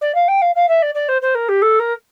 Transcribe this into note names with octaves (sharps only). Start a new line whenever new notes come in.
D5
F5
G5
F5
F5
E5
D5
D5
C5
C5
A#4
G4
A4
A#4